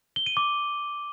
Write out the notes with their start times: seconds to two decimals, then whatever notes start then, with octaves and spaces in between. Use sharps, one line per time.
0.16 G7
0.26 D#7
0.37 D6